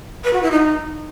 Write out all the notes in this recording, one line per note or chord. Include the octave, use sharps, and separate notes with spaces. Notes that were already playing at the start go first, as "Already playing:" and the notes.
B4
F#4
E4
D#4